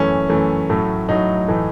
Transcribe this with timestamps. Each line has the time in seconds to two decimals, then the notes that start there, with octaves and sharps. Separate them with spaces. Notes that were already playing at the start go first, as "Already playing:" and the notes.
Already playing: F#2 E3 A3 C#4
0.29 F#2 E3 A3
0.70 A2 F#3 A3
1.08 A2 F#3 A3 D#4
1.48 A2 E3 A3